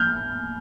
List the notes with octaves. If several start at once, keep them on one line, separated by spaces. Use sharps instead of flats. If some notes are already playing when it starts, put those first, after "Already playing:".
Already playing: F6 G6